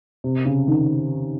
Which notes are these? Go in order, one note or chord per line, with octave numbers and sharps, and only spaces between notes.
C3
C#3
D#3